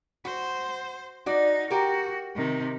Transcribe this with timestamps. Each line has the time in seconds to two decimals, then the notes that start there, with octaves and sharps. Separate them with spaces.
0.25 F#4 C5
1.26 D#4 F#4 D5
1.70 F#4 G4 A#4
2.35 C3 D#3